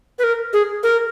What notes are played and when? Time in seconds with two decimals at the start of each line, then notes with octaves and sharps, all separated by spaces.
0.19 B4
0.24 A#4
0.53 G#4
0.83 A#4